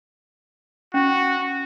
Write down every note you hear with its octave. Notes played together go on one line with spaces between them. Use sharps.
C#4 F#4